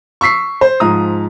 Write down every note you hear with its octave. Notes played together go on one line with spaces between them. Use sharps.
C#6 E6 B6 C7
C5
G#2 F3 A#5 D#6